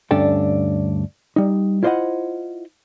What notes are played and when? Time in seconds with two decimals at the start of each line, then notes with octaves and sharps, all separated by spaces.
0.11 D2 G2 C#4 D4 A4 G5
1.36 G3 D#4
1.83 E4 F4 C5 D5 D#5 F#5